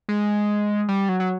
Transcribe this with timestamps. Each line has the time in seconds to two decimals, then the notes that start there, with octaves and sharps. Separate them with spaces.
0.09 G#3
0.89 G3
1.09 F#3
1.20 F#3